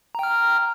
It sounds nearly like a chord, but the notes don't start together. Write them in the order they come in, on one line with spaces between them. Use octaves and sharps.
A#5 G5 F6